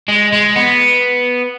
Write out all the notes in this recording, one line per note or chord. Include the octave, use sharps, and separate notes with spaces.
G#3
G#3
B3